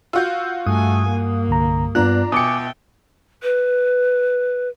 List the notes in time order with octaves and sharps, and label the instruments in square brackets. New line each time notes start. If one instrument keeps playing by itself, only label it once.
[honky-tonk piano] F4 F#4 [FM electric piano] E6 G6
[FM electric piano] G2 D#6 [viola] A3 G#5
[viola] A#3
[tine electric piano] C2 D3 A#5
[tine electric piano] G2 B3 F#6 [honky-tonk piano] D4 A#5 [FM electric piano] F4
[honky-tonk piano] B2 C#7 [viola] E5 G5 [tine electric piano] G#5 D6 D#6
[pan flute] B4